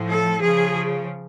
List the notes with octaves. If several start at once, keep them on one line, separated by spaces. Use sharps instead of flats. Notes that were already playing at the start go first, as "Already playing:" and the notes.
Already playing: A2 F3
A4
C#3 F3 G#4